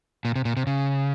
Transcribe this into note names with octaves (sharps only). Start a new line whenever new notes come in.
A#2
C3
A#2
C3
C#3